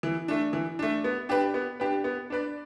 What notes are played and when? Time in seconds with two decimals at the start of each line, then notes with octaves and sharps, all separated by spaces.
0.03 E3
0.28 A3 D4
0.53 E3
0.79 A3 D4
1.04 B3
1.29 D4 G4 B4
1.54 B3
1.80 D4 G4 B4
2.04 B3
2.30 D4 B4 D5